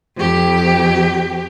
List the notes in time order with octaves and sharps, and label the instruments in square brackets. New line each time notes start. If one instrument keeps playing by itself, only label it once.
[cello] F2 G4